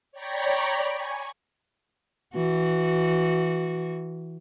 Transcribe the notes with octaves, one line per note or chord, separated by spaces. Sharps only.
C#5 D5 G5 A#5 B5 C#6
G#5 C#6
E3 F#4